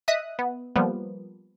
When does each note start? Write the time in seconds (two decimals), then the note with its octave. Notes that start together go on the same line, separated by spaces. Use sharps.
0.08 D#5 E5 D#6 F#6
0.39 B3
0.76 F3 G3 A#3 B3